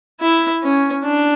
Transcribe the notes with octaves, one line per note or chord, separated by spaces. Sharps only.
E4
C#4
D4